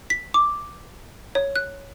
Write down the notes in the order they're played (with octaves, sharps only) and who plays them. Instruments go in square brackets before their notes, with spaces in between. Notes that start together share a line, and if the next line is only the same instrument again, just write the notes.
[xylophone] B6
D6
C#5
F#6